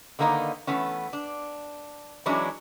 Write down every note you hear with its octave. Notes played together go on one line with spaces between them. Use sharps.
D3 D#3 A#3 B3 D#4
E3 A3 B3 C#4
D4
E3 F#3 G#3 C#4 D4 E4